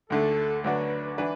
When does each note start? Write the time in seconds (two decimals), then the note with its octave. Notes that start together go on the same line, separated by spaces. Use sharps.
0.10 D2 D3 A3 A4
0.64 D2 D3 F#3 D4 F#4 B4
1.18 E3 D4 B4